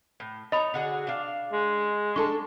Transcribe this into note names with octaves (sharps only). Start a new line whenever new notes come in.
A2
D#4 C#5 D#5 A#5 B5
D3 F#4 G#4
D4 F5
G#3
D4 A4 A5 C#6